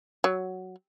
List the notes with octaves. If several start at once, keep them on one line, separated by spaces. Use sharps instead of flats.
F#3